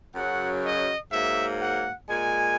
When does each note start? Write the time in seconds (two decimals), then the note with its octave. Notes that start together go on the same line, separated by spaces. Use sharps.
0.15 F#2 C#3 F#3 F#5
0.64 D#5
1.12 G#2 F#3 A#3 E5
1.60 F#5
2.09 A#2 G#3 G#5